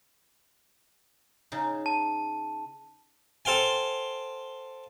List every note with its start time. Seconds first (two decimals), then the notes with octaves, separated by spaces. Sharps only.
1.52 C#3 D#4
1.86 A5
3.45 A4 C5 F5 G5 G#5